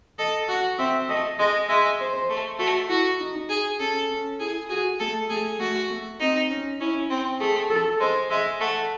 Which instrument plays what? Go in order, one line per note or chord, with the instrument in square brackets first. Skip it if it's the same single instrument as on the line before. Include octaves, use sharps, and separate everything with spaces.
[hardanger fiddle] A4 [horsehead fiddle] D#5
[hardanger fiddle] F#4 [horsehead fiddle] F#5
[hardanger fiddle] C4 [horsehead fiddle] E5
[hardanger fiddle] A3 [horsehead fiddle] D#5
[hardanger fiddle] G#3 [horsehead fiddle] D#5
[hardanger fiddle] G#3 [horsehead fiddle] E5
[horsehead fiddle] C5
[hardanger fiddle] A3
[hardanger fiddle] A3 [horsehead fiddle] F#4
[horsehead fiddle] E4 [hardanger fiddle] F#4
[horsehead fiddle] D#4
[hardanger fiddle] G#4
[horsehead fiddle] C#4 [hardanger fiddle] A4
[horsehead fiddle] C#4
[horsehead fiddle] E4 [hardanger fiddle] G#4
[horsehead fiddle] F#4 [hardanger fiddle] G#4
[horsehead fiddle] A3 [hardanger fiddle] A4
[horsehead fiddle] A3 [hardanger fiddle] G#4
[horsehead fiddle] A3 [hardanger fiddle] F#4
[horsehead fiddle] A3
[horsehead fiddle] C4 [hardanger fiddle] D#4
[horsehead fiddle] C#4
[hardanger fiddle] C#4 [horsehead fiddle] E4
[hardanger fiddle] C4
[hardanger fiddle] A3 [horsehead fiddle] G#4
[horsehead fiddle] A4
[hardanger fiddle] G#3 [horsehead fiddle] C5
[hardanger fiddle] G#3 [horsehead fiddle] E5
[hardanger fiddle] A3 [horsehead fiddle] F#5